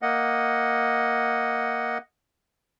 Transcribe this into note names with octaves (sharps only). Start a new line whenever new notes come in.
A#3 D#5 F#5